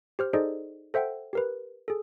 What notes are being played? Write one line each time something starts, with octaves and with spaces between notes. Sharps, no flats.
G4 C5 F6
D#4 G#4 A4 C5 D5 D#5
A4 C5 E5 F#5 G5
G4 A#4 B4
G#4 A4